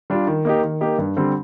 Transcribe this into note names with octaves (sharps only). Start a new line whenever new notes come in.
G3 D4 F4
D#3
A#3 D#4 G4
D#3
A#3 D#4 G4
G2
D3 G3 C4